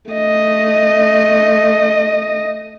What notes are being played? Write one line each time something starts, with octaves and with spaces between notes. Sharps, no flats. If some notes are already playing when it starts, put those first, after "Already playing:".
A3 D#5